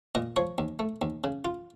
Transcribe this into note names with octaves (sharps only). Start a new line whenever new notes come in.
A#2 D#5
F3 C#5
D#2
A3
D#2
C#3
F4